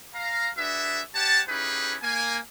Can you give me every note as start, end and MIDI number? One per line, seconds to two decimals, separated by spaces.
0.14 0.49 77
0.14 0.49 82
0.58 1.01 62
0.58 1.01 66
0.58 1.01 68
0.58 1.01 71
0.58 1.01 76
1.15 1.41 67
1.15 1.41 73
1.15 1.41 78
1.15 1.41 81
1.49 1.96 61
1.49 1.96 63
1.49 1.96 64
1.49 1.96 67
1.49 1.96 68
1.49 1.96 71
2.03 2.38 58
2.03 2.38 80